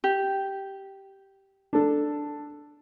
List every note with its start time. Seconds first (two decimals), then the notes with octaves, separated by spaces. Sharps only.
0.04 G4
1.73 D4 A4